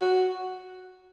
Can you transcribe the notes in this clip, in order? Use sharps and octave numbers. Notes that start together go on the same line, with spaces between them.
F#4